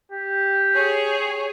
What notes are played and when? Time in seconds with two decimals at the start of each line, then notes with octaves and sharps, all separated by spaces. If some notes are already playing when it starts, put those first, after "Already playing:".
0.12 G4
0.74 G#4 C#5